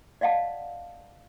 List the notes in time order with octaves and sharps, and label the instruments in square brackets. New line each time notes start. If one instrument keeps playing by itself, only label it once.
[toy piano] D5 D#5 F5 F#5 A5